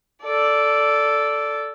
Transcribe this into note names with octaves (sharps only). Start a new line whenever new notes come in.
A4 D5